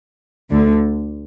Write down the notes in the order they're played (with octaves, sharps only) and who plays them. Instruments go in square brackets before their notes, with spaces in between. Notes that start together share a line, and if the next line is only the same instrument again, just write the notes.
[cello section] D2 D3